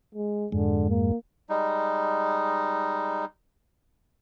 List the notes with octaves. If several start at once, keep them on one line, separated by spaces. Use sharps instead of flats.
G#3
F2 G#2 D3 G#3
A#3
G3 G#3 D#4